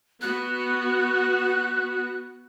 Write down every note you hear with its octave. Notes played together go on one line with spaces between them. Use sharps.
B3 F#4 F#6